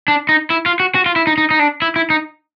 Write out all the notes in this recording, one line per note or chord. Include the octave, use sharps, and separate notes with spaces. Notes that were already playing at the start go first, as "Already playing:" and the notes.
D4
D#4
E4
F4
F#4
F#4
F4
E4
D#4
D#4
D#4
D4
E4
E4
D#4